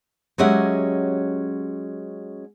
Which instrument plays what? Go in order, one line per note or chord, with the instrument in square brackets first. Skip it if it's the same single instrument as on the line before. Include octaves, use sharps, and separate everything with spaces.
[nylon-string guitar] F#3 G#3 C#4 G4 E5 F#5